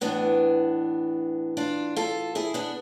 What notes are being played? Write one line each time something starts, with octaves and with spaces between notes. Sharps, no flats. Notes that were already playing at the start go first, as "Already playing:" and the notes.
A2 E3 B3 D4
D4 F4
F4 A4
E4 G#4
B3 D4